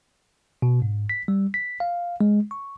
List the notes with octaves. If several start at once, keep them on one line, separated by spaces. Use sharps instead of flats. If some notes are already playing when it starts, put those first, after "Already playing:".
B2
G#2
B6
G3
B6
F5
G#3
C#6